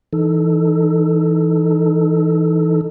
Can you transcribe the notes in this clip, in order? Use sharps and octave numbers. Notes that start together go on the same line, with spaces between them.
E3 D#4 A4